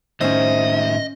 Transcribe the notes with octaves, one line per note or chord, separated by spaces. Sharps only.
A2 D#3 C#4 F4 C5 D#5 E5